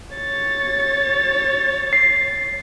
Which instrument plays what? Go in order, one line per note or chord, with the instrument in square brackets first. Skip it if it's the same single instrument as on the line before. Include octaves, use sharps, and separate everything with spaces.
[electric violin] C#5 A6
[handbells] C7